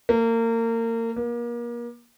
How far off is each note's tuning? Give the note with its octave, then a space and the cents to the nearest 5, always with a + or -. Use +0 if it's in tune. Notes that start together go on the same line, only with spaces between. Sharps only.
A#3 -30
A#3 +35